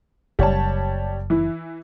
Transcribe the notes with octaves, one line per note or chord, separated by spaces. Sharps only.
F#1 G3 C#5 A5
E3 E4